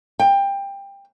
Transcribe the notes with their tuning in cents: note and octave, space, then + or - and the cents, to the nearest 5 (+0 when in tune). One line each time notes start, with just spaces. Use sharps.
G5 +20